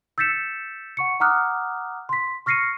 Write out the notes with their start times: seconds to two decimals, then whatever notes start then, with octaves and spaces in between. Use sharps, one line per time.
0.18 E6 G6 A6 B6 C#7 E7
0.97 F#5 C#6 C#7
1.20 F#5 A#5 D6 D#6 F6 F#6
2.09 C6 B6
2.46 C#6 F6 A#6 C7 C#7 D#7